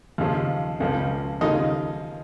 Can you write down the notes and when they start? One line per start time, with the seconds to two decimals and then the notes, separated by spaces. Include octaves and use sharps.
0.18 D#2 C#3 F3
0.80 C#2 C#3 F3
1.41 D#2 C#3 F3 D#4 D#5